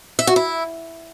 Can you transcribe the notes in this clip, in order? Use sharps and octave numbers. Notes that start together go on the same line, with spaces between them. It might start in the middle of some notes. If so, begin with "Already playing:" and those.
E5
F#4
E4